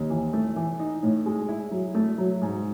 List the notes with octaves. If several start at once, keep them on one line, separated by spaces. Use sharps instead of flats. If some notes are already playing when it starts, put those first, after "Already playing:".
Already playing: D#2
E3
A3
E3
D#4
A2
G#3
E4
F#3
A3
F#3
G#2